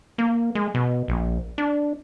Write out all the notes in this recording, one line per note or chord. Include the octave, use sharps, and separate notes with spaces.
A#3
G#3
B2
A#1
D4